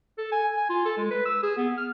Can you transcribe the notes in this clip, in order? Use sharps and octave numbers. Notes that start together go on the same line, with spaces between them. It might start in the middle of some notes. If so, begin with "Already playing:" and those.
A4
G#5
G#5
F4
A4
G#3
B4
E6
G#4
B3
F6